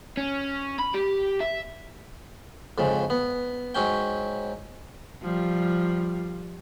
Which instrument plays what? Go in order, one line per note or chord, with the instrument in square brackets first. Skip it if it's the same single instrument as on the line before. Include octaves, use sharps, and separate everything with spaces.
[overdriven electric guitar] C#4
B5
G4
E5
[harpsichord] F2 G#2 C#3
B3
G#2 F#3 C#4 G5
[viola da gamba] F3 G3 F4